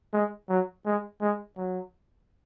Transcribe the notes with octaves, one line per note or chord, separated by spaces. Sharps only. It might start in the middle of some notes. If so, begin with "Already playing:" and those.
G#3
F#3
G#3
G#3
F#3